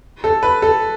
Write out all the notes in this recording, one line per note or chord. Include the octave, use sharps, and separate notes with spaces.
A4
B4
A4